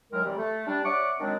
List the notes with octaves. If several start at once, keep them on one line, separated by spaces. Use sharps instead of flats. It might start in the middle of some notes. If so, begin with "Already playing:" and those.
D#3 E3 F#3 G#3 A#4
C3 E3 G3
A3
G3 D4
C#5 D5 E5 F#5 C#6 D6
D#3 F#3 G#3 C4 D4